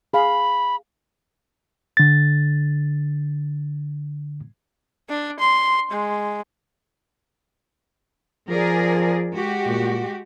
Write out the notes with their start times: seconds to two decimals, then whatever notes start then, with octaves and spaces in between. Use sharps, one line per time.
0.13 G#4 F5 B5
1.97 D3 A6
5.09 D4
5.39 C6
5.91 G#3
8.49 F3 G#4 A#4 D5
9.35 G#3 F#4 G4
9.66 A#2